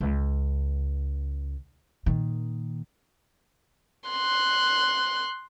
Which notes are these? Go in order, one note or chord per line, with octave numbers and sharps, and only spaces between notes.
C#2
A#2 D#3
C6 F#6